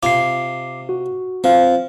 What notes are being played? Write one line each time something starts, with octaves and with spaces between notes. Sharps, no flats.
C3 F4 G#5 D6 C7
F#4
F3 C4 C5 F5